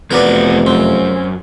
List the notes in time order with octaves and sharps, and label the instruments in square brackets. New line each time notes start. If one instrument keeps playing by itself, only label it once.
[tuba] F1 [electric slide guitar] E2 B3 F#4 [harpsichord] A#4 B4 D5
[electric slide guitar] F#2 [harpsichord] C4